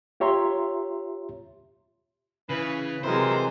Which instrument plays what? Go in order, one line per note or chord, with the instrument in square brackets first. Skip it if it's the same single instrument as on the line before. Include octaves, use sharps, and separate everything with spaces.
[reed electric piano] F4 G4 C#5 E5 A#5 C6
[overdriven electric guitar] C#3 [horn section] E3 B4
[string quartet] C3 F#3 G#3 [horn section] E3 [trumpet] A#4 [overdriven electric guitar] C5